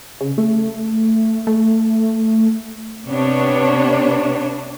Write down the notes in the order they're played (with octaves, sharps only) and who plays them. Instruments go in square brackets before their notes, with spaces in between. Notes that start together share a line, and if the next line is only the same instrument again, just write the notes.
[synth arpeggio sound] C#3
A3
A3
[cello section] C3 B3 D4 C#5